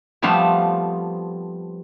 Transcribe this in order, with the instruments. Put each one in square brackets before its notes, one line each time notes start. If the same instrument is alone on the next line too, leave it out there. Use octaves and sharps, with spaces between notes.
[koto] F3 G3 A3 B3 C4